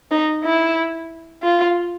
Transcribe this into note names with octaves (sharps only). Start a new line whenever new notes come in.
D#4
E4
F4